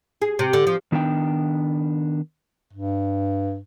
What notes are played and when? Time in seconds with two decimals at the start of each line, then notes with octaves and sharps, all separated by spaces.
0.22 G#4
0.39 C3
0.53 D3
0.67 F3
0.92 D#3 B3 D4 G5
2.73 G2